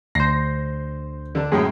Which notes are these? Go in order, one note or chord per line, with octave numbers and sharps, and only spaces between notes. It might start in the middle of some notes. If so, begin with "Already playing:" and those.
D2 C5 A#6 C7
D3 D4
F#2 A2 G#3 G#4 G5